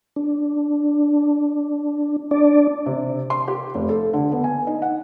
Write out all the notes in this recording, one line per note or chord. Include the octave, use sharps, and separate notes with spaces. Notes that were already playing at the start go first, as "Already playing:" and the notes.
D4
D4 D5
C3
C6
G4
F1
A4
D3
B3
G#5
D#4
F#5